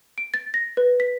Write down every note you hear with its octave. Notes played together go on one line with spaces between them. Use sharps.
D7
A6
A#6
B4
B6